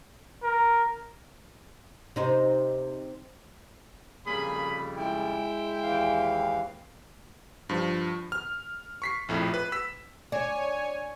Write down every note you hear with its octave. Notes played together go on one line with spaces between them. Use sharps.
A#4
C3 D#4 C5
F2 C#3 G3 A#3 G#4 B5
G#3 E4 G5
D#2 E3 F5
G2 F3
F6
C#6 B6 C7
A#1 F2 A2
B4
E6 B6
D4 C#5 D5 G#5